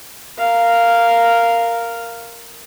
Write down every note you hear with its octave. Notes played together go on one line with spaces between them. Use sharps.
A#4 F5